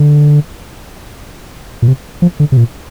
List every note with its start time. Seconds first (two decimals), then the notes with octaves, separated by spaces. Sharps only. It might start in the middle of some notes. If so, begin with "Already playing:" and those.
Already playing: D3
1.82 A#2
1.87 C3
2.22 F3
2.40 D3
2.52 C3
2.57 A#2